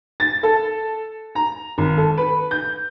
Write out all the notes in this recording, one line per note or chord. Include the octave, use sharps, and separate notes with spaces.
A6
A4
A#5
G#1
A4
B4
G6